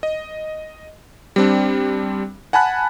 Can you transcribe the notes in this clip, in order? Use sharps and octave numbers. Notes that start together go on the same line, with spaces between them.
D#5
G3 C4 D4
F#5 G#5 A5 B5 F#6